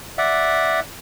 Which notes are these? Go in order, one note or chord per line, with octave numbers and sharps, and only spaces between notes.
D5 E5 F#5